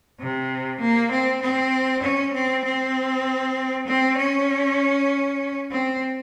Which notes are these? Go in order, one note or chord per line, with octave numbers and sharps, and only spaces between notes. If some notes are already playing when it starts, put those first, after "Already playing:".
C3
A#3
C4
C4
C#4
C4
C4
C4
C#4
C4